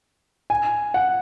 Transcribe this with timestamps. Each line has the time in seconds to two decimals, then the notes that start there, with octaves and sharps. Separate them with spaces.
0.50 G#5
0.94 F#5